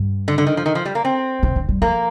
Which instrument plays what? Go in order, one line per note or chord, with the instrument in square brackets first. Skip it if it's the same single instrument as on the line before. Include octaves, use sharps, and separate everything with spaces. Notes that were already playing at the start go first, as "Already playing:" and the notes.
Already playing: [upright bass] G2
[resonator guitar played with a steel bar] D3
D3
D#3
F3
D#3
F3
G3
A#3
C4
[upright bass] C3
D3
G3
[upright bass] F3 [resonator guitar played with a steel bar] A#3